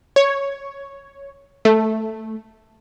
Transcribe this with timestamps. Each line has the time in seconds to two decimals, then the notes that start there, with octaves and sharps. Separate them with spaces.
0.16 C#5
1.65 A3